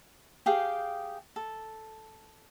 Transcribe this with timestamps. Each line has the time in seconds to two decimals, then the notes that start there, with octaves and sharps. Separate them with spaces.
0.46 G4 G#4 F5 G5
1.36 A4